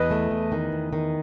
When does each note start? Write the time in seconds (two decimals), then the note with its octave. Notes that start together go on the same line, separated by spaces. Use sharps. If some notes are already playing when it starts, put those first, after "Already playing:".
Already playing: E2 B4 D#5
0.11 A3
0.31 E2
0.52 D#3
0.72 E2
0.93 D#3